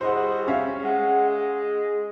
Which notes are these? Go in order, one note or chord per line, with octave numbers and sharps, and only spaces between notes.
G3 E4 F#4 G#4 C5 D#5 F#5
C#4 E5 F5
G#3 F#5
G#4